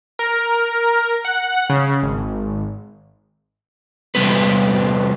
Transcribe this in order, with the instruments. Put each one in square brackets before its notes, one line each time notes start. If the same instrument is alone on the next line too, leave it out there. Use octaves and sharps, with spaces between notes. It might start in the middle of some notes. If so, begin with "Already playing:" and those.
[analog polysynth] A#4
F#5
C#3
G#1
[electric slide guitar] E2 C3 G3 B3 B4